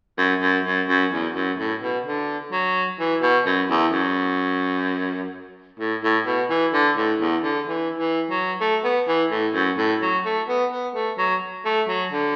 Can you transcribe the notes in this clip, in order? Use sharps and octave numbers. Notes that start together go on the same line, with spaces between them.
F#2
F#2
F#2
F#2
E2
F#2
A2
B2
D3
F#3
E3
B2
F#2
E2
F#2
A2
A2
B2
E3
D3
A2
E2
D3
E3
E3
F#3
A3
B3
E3
A2
F#2
A2
F#3
A3
B3
B3
A3
F#3
A3
F#3
D3